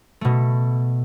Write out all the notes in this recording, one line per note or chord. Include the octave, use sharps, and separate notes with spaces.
B2 A3